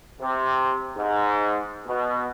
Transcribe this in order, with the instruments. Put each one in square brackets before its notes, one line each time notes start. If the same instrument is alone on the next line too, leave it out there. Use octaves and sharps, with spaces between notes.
[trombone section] C3
G#2
B2